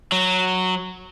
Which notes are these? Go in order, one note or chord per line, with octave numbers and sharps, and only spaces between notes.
F#3